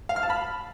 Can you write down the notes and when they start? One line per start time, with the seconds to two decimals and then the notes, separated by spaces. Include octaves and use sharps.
0.09 F5
0.16 F6
0.23 A5
0.30 B5